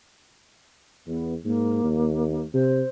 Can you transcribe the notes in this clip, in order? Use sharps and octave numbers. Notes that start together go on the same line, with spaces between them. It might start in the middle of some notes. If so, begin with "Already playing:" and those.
E2 B3
G#2 A#3
D#2
C3 C5